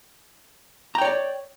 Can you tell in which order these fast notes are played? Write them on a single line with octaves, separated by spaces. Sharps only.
A#5 G5 C#5 D5